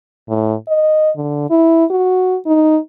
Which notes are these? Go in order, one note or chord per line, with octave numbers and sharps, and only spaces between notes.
A2
D#5
D3
E4
F#4
D#4